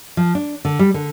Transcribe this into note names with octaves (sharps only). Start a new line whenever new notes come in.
F3
D4
D3
G3
D3